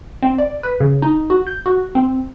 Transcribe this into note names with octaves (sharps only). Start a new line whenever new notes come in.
C4
D5
B4
C#3
D#4
F#4
G6
F#4
C4